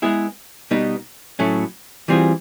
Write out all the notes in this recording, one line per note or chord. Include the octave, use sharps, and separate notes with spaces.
G#3 B3 E4 G#4
B2 G3 B3 D#4
A2 F#3 A3 C#4
E3 G3 C4 F4 G#4